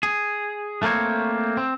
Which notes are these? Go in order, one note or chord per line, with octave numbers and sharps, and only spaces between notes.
G#4
A3 A#3 C4 C#5
C4